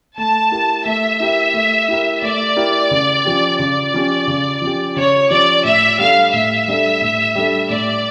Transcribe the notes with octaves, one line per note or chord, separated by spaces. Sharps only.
A3 A5
E4 G4 A#4
A3 E5
E4 G4 A#4
A3
E4 G4 A#4
A3 D5
E4 G4 A#4
C#3
F3 C#4 G4
C#3 D5
F3 C#4 G4
C#3
F3 C#4 G4
C#3 C#5
F3 C#4 G4 D5
A2 E5
G3 D4 A4 F5
A2 E5
G3 D4 A4
A2
G3 D4 A4
A2 D5